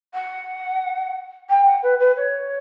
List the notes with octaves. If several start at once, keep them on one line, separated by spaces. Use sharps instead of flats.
F#5
G5
F#5
B4
B4
C#5